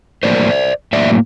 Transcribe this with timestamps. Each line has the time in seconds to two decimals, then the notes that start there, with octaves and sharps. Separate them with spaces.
0.23 A2 F#3 A#3 C5 D5
0.93 A2 F#3 A#3 D5 E5